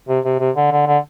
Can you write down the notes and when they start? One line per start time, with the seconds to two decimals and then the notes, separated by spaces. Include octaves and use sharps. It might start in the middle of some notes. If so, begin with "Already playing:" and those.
0.08 C3
0.25 C3
0.39 C3
0.56 D3
0.71 D3
0.87 D3